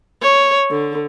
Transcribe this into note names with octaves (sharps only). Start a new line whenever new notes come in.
C#5
D3